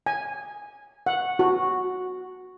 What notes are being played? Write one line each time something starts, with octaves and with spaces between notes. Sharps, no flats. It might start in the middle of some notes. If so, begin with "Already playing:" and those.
G#5
F#5
F#4